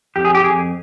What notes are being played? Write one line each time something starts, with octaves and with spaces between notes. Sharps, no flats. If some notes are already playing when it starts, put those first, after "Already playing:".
F2 G4
G#4
G4
F2 G#4